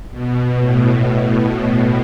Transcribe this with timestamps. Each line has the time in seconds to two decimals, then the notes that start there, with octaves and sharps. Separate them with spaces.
0.11 B2
0.58 A2